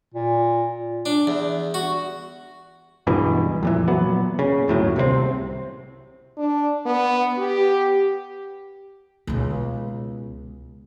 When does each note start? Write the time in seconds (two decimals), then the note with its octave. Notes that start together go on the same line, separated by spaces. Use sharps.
0.14 A#2
1.06 D4
1.27 E2
1.74 F#4
3.07 C#2 G2 B2 E3
3.63 F2 A#2 E3
3.88 A#2 F#3 B3
4.39 C#3
4.68 G1 D#2 A2 F#3
4.96 C2 C3 D#3 C4
6.37 D4
6.86 B3
7.38 G4
9.27 C#2 B2